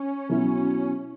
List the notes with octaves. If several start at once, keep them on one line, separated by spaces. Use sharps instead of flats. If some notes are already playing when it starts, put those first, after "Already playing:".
Already playing: C#4
B2 F#3 E4